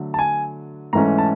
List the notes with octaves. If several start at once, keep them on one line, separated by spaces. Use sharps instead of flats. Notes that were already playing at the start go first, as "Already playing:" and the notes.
Already playing: D3 F#3 A3 D4
A5
G#5
G#2 E3 A3 C#4 A#5
A5